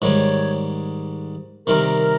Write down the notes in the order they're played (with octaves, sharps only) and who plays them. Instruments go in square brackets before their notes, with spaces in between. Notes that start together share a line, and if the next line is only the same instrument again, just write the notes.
[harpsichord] G#2 D#3 G3 [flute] C#5
[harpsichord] C3 D#3 G3 C4 [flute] A#4